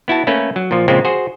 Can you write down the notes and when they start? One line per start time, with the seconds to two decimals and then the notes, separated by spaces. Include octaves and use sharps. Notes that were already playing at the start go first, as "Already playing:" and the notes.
0.08 B3 E4 F#4 A5
0.27 A3 A#3 C#4 B4
0.56 F#3
0.71 A#2 F3
0.88 A#2 C#3 F3 G#3 C4
1.05 F#4 G#4 C5